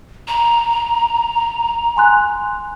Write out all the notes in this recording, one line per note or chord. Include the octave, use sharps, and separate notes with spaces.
A#5
G#5 C6 F#6